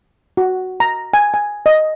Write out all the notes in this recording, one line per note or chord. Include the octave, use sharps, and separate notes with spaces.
F#4
A#5
G#5
G#5
D#5